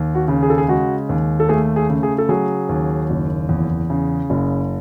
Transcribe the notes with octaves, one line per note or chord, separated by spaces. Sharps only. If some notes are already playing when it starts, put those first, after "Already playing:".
Already playing: D#2
F#4
C#3
G#4
A4
G#4
G#3 F#4
D#2
A4
A3 G#4
G#4
C#3
G#4
A4
F#3 G#4
D#2
F#1
E2
C#3
F#1